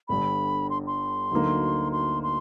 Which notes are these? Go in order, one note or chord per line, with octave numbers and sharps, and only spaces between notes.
G1 G2 D3 B5
C6
C6
D2 D3 F#3 A#3 D#4
C6
C6